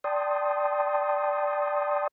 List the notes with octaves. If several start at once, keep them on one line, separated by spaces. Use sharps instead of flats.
D5 G5 A5 C6 D#6